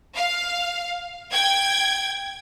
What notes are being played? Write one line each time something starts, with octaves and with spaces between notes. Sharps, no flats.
F5
G5 G#6